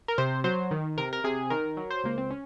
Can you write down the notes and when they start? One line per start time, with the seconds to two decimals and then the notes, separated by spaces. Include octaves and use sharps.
0.08 A#4
0.18 C3 C5
0.44 F#3 C5
0.71 D#3
0.98 C3 A#4
1.13 A#4
1.24 C3 G#4
1.50 D#3 A#4
1.77 F#3
1.91 C5
2.04 C#2 A#3
2.18 C4
2.30 C#4